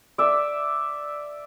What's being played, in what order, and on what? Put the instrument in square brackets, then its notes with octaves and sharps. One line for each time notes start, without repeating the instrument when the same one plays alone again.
[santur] D5 E5